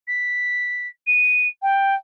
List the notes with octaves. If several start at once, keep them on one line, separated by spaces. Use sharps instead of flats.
B6
D#7
G5